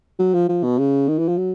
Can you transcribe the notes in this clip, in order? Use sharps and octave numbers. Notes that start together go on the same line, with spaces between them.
F#3
F3
F3
B2
C#3
D#3
E3
F3
F#3